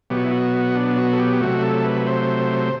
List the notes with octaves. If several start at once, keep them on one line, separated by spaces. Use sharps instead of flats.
B2 F#3 B3 G4
F#4
E4
F#4
D4
F#4
A4
G4
C3 F#3 A3 F#4
A4
B4
C5